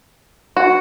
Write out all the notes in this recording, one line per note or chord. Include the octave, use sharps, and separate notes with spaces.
F#4